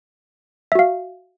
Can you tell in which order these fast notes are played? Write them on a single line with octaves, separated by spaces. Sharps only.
E5 F#4 F5